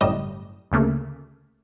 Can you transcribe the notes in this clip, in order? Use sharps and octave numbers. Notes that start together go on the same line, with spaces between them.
G1 F#2 A2 G3 D#5 E7
D2 C#3 A3 A#3